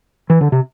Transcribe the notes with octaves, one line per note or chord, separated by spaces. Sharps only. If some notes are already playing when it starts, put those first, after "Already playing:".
E3
D3
C3